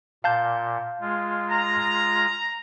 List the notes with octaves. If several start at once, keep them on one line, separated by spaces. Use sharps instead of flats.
A#2 F5 A5 G6
G#3 F4
A#5